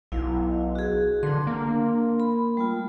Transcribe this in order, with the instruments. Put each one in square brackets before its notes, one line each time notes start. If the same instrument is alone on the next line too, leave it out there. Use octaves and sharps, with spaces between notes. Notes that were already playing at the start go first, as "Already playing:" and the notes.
[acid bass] B1 [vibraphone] E4 F5
[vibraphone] F#4 G#4
[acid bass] D3 [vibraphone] D4 C6
[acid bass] A#3
[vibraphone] B5
G3 A3 F4